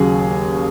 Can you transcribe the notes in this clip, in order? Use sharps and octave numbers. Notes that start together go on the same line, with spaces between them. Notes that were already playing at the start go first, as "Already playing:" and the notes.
Already playing: D#2 C#3 F#3 G#4